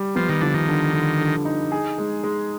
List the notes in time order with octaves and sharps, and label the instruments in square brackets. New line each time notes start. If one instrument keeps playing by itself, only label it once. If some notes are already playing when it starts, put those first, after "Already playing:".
Already playing: [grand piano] G3
[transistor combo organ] F3 [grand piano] B3
[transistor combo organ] D#3
[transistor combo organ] D3 [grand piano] F3
[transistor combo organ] D#3
[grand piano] D3
D3
D3
D#4
G#4
G#3
G#3